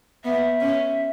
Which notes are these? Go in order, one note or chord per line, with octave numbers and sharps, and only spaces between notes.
B3 E5
C#4